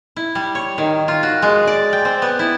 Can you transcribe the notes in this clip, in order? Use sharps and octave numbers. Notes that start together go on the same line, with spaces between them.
E4
G3
C#5
D#3
F4
F#4
G#3
D5
G5
C4
B3
E4